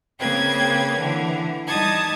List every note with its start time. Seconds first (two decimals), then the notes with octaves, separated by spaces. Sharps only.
0.20 C#3 A#3 C4 B4 G5 G#6
0.98 D3 E3
1.68 G3 D#4 A5 D#6 G#6